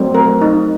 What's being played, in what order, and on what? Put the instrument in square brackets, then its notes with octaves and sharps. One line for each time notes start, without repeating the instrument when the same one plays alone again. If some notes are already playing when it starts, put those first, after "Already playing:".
Already playing: [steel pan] F#3 A3 C4
A#4
D#4